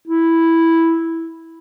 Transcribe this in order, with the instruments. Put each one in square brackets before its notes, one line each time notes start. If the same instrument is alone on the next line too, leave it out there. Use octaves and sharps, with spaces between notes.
[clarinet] E4